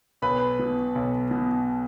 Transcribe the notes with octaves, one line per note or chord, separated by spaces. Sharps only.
B1 B4 B5
B2
B1
B2